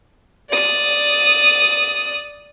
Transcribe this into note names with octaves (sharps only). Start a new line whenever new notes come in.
D5 D#6